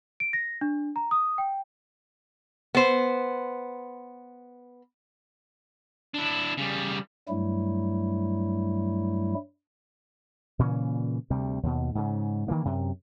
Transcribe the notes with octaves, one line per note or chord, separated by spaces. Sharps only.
D7
A#6
D4
A#5
D#6
G5
B3 C5
D4 E4
C#3 G3
G2 F#3 G3 A3 E4
A#2 C#3 E3 C#4
D2 C3 G3
D#2 B2
G#2 C#3
D#3 E3 A#3
F#2 C3